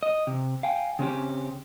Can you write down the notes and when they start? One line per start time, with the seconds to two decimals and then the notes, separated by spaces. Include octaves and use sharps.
0.03 D#5
0.27 C3
0.63 F5 G5 G#5
0.99 C#3 C4 C#4 G4